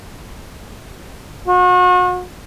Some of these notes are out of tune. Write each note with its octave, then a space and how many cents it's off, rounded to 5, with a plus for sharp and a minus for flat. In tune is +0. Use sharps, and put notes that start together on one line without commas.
F#4 -40